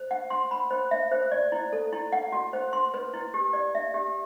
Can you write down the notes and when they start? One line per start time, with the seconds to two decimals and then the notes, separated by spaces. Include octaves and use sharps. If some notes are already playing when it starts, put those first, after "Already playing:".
Already playing: C5
0.11 F#5
0.30 C6
0.51 B5
0.71 C5
0.91 E5
1.11 C5
1.32 D5
1.52 E4
1.73 A4
1.93 E4
2.12 F#5
2.32 F#4
2.53 C5
2.73 C6
2.94 B4
3.14 E4
3.34 G4
3.53 D5
3.75 E5
3.94 G4